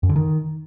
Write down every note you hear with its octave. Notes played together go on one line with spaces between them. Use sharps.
F#2
D3
D#3